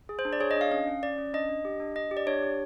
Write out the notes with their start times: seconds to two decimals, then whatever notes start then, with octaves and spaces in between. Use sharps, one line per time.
0.09 G#4
0.19 C5
0.25 D4
0.33 D5
0.40 G#4 C#5
0.51 D#5
0.56 D4
0.61 F5
0.71 C#4 F5
0.88 C#4
1.03 C#4 D5
1.18 C#4
1.33 D4 D#5
1.49 D4
1.65 G4
1.80 D4
1.96 D4 D#5
2.11 G4
2.17 D5
2.27 D4 C#5
2.43 G4